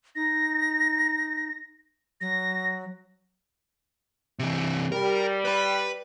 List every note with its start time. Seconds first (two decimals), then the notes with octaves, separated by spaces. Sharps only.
0.16 D#4 A#6
2.21 F#3 A#6
4.39 C3 E3
4.92 G3 A#4
5.45 B4 B5